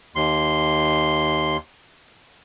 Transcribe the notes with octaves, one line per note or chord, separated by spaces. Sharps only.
D#2 C6